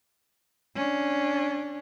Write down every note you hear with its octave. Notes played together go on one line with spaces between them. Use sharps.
C#4 D4